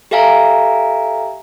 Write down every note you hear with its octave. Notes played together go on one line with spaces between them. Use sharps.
G4 A4 E5 F5 G#5 A#5